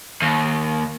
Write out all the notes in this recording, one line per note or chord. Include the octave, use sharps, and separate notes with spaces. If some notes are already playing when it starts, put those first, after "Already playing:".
D#2